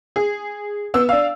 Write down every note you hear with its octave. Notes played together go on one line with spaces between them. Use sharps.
G#4
B3 E6
D4 F5